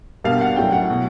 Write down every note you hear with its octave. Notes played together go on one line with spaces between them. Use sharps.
B2 G3 A#3 D4 F5
F#5
A2 F#3 A3 C#4 G5
F#5
B2 F#3